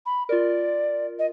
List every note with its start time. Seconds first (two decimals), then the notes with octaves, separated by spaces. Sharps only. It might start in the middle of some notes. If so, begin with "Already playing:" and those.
0.06 B5
0.29 F4 A#4 D5
1.19 D#5